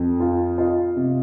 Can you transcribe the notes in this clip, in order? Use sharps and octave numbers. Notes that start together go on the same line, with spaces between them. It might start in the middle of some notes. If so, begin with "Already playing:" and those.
Already playing: F2
F4
F4 D#5
C3